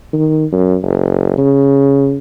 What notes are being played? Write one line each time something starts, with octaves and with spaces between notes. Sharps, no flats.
D#3
F#2
F#1
C#3